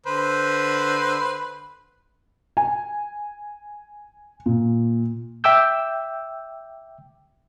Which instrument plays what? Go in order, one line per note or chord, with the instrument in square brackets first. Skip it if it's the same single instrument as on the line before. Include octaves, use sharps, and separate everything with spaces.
[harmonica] D3 B4 C5
[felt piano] G#5
A#2
[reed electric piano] E5 G5 D6 E6 G6